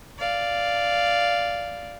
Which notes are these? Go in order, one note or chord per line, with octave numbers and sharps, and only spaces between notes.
D5 F5